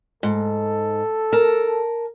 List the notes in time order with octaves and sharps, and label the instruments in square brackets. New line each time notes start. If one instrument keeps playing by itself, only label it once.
[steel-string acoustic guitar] G#2 [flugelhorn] A4
[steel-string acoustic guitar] A#4 A5